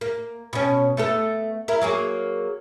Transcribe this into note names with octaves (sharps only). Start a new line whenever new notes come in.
A#3
B2 C#4
A3 B3 A4
E4 A#4
F#3 A#3 G#4